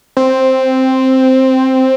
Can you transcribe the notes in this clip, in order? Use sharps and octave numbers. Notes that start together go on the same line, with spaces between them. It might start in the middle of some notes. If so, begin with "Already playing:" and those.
C4